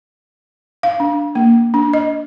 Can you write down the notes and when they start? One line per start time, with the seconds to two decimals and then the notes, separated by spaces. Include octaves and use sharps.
0.83 F5
1.00 D4
1.35 A#3
1.74 D4
1.93 D#5